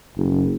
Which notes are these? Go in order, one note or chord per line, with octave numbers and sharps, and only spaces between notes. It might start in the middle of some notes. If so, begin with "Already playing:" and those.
F#1